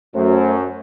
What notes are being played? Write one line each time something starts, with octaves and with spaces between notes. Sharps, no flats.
F#2 A3 C5